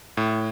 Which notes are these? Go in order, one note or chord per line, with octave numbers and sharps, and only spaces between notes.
A2